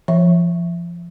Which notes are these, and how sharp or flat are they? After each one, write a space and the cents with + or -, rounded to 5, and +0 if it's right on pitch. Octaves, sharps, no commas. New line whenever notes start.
F3 -25 E5 +0